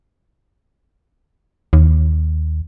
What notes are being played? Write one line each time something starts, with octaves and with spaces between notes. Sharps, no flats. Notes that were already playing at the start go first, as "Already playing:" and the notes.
D#2